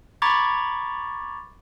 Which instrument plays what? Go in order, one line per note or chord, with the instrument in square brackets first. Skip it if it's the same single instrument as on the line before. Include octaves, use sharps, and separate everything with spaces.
[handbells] A#5 B5 C#6 D6 G#6 A6